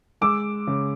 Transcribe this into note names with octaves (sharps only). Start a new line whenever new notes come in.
G#3 D6 E6
C#3